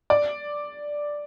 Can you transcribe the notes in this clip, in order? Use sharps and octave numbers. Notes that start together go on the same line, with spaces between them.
D5